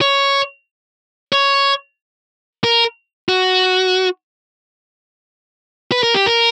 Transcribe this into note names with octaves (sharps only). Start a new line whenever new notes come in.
C#5
C#5
A#4
F#4
B4
A#4
G4
A#4